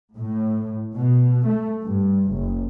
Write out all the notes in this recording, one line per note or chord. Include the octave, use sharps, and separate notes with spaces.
A2
B2
A3
G2
F#1